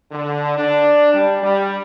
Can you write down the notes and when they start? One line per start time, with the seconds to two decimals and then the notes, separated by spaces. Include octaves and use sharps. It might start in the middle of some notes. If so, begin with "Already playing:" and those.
0.12 D3
0.57 D4
1.14 G3
1.43 G3